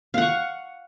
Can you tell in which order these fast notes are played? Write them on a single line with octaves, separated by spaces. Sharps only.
F5 F#5 C#6